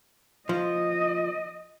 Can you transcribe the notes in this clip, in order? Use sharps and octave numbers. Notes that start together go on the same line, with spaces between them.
F3 D#5